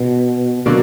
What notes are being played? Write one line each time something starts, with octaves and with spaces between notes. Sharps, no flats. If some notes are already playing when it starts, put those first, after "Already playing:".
Already playing: B2
B2 D3 F#3 A#3 D4